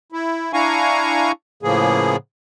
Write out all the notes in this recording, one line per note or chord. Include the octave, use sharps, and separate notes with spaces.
E4
D4 E4 F5 G#5 A#5 C#6
A2 C#3 F3 A#3 B3 G#4